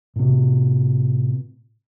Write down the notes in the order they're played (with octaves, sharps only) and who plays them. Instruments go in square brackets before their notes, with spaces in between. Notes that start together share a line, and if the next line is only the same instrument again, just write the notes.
[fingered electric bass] A2 C3